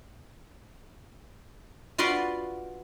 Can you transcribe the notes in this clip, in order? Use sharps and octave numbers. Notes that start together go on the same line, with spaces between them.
F4 F#4 B4 D5 C6